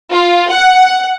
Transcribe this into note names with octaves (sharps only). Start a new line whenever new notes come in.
F4
F#5